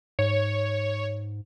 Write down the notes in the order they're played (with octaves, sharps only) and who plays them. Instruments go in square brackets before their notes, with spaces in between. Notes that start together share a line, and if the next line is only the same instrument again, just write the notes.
[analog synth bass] G#2 [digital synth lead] C#5